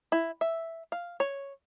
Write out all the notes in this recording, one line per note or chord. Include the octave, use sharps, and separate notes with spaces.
E4
E5
F5
C#5